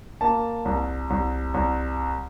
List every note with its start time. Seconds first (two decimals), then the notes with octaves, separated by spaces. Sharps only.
0.21 A#3 A5
0.65 C2
1.10 C2
1.54 C2